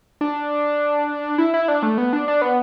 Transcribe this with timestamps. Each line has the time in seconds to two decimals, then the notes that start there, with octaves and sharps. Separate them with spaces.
0.21 D4
1.38 E4
1.54 E4
1.68 D4
1.83 A3
1.98 B3
2.13 D4
2.28 D4
2.42 B3